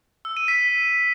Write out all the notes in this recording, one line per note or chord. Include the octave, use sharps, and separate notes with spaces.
E6
D#7
B6